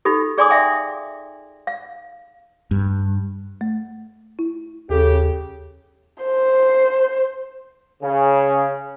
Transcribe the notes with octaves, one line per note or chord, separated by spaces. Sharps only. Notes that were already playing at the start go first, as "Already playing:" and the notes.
D#4 F4 G4 A4
G#4 D5 G#5 C6 D6 D#6
D5 E5 F5 G5 G#5
F5
G2
A3
E4
D#2 C#3 G4 A4
C5
C#3